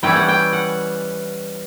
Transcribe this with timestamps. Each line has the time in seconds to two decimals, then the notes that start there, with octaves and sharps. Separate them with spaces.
0.03 E3 G3 C#4 E4 G5
0.16 F#5
0.29 G5
0.53 F#5